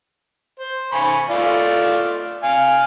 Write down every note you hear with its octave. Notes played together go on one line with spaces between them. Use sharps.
C5
G#5 B5 C#6
A3 F4 D5
F5 G#5